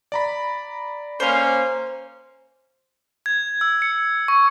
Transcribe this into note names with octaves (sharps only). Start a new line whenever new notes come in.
D5 A#5 B5
A#3 C#4 C5 F6
G#6
E6
C#7
C#6